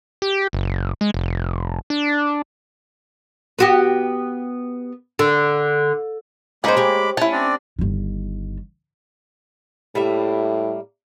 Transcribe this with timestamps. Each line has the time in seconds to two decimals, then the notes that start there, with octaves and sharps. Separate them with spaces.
0.22 G4
0.53 F#1
1.01 G#3
1.14 F1
1.90 D4
3.59 B3 F#4 G4
5.19 D3
6.64 G#3 A#3 C#4 D#4 G#4 C5 B5 D6
6.77 G4 C#5
7.17 C#4 E4 A5
7.32 C4 D4 D5
7.79 G1 D#3
9.95 A2 G3 A#3 E5